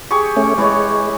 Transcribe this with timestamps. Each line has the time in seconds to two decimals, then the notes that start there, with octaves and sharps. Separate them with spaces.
0.11 G4 G#4 C#6
0.36 A3 C#4
0.58 E3 G#3 C#5